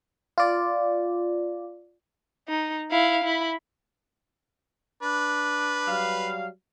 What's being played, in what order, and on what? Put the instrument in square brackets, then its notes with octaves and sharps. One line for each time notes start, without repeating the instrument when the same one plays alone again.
[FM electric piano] F4 D5
[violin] D#4
E4 F5
E4 B5
[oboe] D4 [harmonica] B4
[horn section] F#3 G3 F5